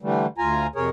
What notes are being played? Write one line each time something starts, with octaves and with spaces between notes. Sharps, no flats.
D3 E3 G3 A3
D2 F4 G#5 A#5
F2 C3 G#4 A#4 C#5